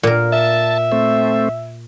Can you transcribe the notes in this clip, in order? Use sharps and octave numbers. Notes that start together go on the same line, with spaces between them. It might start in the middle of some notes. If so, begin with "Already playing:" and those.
A#2 A#4
E5 A5
A3 C4